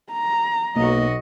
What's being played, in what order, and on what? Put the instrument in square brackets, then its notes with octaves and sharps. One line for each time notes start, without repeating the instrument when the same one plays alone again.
[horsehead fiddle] A#5
[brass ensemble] B1 [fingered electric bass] A#3 [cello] F#4 D#5